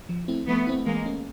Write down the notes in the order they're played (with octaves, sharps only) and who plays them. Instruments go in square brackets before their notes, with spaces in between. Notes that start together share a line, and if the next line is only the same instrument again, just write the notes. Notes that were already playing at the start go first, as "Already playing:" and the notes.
[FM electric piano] F3
A3 C4 E4
[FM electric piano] F3 [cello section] A3 B3
[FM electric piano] A3 C4 E4
[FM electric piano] E3 [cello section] G#3 A#3
[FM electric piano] A3 C#4